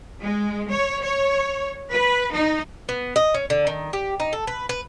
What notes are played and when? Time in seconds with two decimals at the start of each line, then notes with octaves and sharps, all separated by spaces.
0.21 G#3
0.70 C#5
1.02 C#5
1.90 B4
2.32 D#4
2.89 B3
3.16 D#5
3.34 C#4
3.50 D3
3.67 D#3
3.93 G4
4.20 D#4
4.33 A4
4.47 B4
4.69 B4